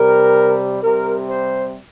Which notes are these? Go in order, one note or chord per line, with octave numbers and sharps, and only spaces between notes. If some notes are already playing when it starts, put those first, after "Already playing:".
Already playing: C3 G3 A#4
C3 G3 A#4
C5